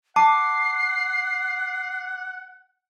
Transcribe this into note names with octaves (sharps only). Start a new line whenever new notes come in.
F#5 A5 D6 C7